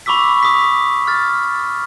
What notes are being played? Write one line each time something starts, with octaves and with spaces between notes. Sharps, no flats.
B5 C#6 D6 E6 B6
D#6 B6
F6 A6